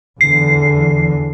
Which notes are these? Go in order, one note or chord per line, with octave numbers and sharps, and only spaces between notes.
E2 D3 E3 C7